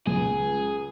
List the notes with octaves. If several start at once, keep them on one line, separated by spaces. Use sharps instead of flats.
C#2 G#4